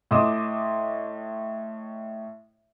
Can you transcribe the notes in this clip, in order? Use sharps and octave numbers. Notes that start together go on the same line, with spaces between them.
A2 D#5 C6 D6 D#6 E7